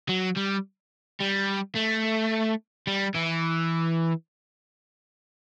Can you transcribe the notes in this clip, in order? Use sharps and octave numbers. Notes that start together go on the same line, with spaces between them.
F#3
G3
G3
A3
G3
E3